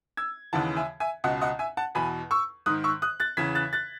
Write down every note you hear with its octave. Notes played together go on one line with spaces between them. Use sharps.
E6 G#6
D#2 C#3 E3 F#5 A5
E5 G#5
E5 G#5
C#2 B2 D#5 F#5
D#5 F#5
E5 G#5
F#5 A5
E2 B2 G#5 B5
C#6 E6
G#2 D#3 D#6 F#6
C#6 E6
D#6 F#6
F#6 A6
E2 C#3 E3 G#6 B6
F#6 A6
F#6 A6